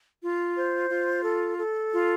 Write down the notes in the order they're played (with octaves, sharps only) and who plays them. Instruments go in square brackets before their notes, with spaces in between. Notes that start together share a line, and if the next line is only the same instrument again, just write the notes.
[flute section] F4
C5
F4
A4
A4
F4